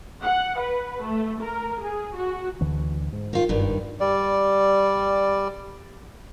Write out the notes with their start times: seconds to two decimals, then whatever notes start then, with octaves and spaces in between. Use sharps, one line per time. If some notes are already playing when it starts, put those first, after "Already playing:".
0.24 F#5
0.59 B4
1.04 A3
1.42 A#4
1.81 G#4
2.16 F#4
2.61 D2 D3 E3
3.13 G#2
3.33 D#3 F4
3.49 F#1 G2 D#3
4.00 G3 D5